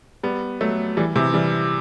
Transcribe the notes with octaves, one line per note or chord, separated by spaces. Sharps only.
G3 B3
F#3 A3
E3 G3
C3 E3
E3 G3